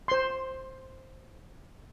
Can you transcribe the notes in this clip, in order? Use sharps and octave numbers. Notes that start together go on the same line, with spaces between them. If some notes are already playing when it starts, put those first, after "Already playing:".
C5 C6